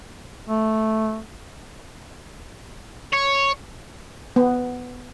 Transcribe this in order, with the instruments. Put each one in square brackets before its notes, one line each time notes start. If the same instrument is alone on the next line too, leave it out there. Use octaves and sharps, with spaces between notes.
[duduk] A3
[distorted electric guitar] C#5
[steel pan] B3